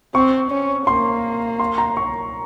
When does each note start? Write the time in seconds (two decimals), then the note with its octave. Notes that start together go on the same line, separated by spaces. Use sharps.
0.14 C4 C#6
0.51 C#4
0.87 A#3 C6
1.60 C6
1.78 A#5
1.97 C#6